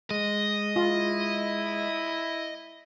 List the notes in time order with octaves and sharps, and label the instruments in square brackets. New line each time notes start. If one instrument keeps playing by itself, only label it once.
[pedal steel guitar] G#3 [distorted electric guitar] D#5
[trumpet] E4 [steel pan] F4